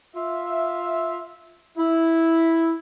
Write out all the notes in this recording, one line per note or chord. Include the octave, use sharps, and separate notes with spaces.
F4 E5
E4